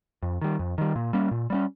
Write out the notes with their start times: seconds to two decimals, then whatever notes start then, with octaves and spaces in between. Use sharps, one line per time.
0.23 F2
0.41 D#3 G3
0.59 F2
0.78 D#3 G3
0.96 A#2
1.13 G3 A#3 C#4
1.31 A#2
1.50 G3 A#3 C#4